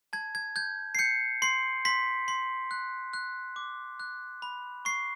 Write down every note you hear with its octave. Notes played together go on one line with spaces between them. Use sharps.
A5 G#6
G#6
G6 G#6
C7
G6 C#7
C6 C7
C6 B6
C6
F#6
F#6
D6
F#6
B5
C#6 C7